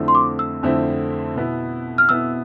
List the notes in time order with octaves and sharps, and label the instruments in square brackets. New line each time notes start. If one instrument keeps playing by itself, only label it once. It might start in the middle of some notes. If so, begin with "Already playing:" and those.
Already playing: [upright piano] F2 D3 A3 C4 E4
[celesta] C6
D6
E6
[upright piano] F2 D3 A3 C4 E4
B2 B3 E4
[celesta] F6
[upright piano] B2 B3 E4 [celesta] E6